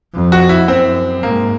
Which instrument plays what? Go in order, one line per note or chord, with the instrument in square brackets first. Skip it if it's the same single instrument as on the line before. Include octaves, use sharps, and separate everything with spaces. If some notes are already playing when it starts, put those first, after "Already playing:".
[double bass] F2
[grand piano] F#4
E4
[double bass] F#2 [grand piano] C4
[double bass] G#2 [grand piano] A#3